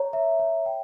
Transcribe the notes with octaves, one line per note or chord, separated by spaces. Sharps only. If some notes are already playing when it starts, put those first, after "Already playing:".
Already playing: C#5 A#5
E5
C#5
G5